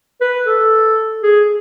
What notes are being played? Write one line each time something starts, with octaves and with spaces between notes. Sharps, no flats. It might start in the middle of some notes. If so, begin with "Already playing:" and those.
B4
A4
G#4